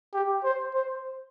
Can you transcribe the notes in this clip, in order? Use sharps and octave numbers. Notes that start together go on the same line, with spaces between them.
G4
C5
C5